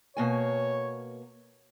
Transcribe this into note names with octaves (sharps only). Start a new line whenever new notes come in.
B2 A#3 C#5 G#5